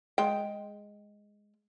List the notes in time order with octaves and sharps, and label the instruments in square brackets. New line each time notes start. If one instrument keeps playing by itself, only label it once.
[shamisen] G#3 G5